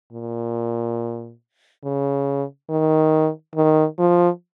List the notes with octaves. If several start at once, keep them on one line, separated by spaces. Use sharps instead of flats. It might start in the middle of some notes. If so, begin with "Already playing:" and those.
A#2
C#3
D#3
D#3
F3